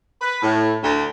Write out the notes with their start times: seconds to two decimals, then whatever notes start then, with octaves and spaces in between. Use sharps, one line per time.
0.21 B4
0.43 A2
0.84 D2